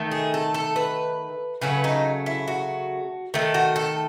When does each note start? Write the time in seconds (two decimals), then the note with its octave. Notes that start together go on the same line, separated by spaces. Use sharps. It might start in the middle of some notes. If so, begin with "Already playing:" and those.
Already playing: D#3 A3
0.12 G#4
0.34 A4
0.54 A4
0.76 B4
1.61 C#3 F#3 A3 B4
1.84 D#4
2.26 E4
2.48 F#4
3.34 D#3 A3
3.54 F#4
3.76 A4